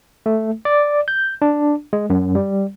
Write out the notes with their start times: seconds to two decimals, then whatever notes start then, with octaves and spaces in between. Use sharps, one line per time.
0.26 A3
0.65 D5
1.08 G6
1.42 D4
1.93 G#3
2.10 F#2
2.35 G3